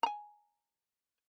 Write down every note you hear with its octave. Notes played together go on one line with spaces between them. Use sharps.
G#5 A#5